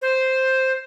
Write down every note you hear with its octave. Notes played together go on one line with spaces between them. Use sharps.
C5